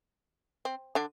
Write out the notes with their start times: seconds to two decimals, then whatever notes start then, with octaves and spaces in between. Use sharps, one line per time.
0.65 C4
0.95 D3 D4